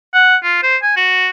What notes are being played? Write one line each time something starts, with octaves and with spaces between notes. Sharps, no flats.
F#5
F4
C5
G#5
F#4